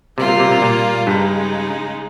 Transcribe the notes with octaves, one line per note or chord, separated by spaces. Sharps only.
C3 G3 A#3 F4
C3
C3
C3
A#2
G2 C#3 G#3 D#4